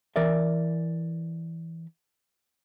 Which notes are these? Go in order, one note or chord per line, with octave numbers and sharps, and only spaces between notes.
E3 A#4 D5 E5